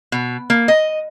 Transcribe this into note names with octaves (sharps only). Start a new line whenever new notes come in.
B2
A#3
D#5